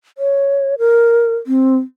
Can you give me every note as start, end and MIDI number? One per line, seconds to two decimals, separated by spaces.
0.18 0.75 73
0.79 1.36 70
1.47 1.77 60